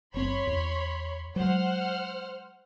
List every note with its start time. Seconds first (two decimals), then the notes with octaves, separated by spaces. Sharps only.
0.14 F#1 C4 C#5 B5 C6
0.47 E2
1.36 F#3 G#3 C5 F#5 F6